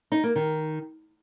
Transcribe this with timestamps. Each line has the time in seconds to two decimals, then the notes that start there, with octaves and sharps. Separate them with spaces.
0.12 D#4
0.24 A#3
0.36 D#3